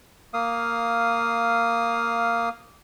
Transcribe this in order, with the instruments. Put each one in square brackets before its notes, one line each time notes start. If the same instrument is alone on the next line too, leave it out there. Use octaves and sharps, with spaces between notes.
[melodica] A#3 F5 D#6